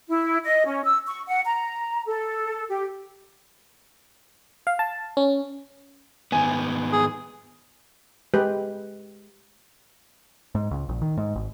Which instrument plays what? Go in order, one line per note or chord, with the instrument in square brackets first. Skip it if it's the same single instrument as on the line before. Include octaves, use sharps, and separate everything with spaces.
[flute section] E4
D#5
C#4
E6
C#6
F#5
A#5
A4
G4
[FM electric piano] F5
A5
C#4
[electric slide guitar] G#2 D#3 B3 [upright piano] G#5
[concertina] G#4
[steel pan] G#3 G4 B4
[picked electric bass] G#2
C#2
A#1
D#3
G#2
G#1